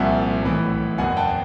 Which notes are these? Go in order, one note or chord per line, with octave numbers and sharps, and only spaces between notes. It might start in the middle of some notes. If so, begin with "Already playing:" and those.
Already playing: C2 A#2 F3 E5 F#5
B1 A2 E3
F#1 E2 B2 F#5 G#5
G5 A5